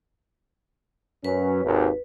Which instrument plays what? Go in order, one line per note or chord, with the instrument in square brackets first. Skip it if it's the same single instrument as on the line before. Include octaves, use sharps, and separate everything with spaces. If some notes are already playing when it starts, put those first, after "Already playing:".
[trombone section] F#2 C#4 [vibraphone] B4
[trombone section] G#1 D#2